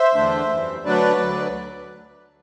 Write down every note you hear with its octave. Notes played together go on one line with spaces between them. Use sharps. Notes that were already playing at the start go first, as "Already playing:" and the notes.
Already playing: C5 E5
E2 D3 A3 D4
F#2 E3 G3
D3 F#3 A3 D4 B4 D5
D2 D3 F#3